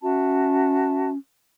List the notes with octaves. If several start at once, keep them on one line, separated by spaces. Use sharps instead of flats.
C#4 F#4 E5 A5